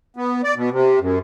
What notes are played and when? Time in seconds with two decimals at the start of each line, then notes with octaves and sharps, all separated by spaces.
0.16 B3
0.44 D5
0.56 B2
0.71 C3
1.00 F#2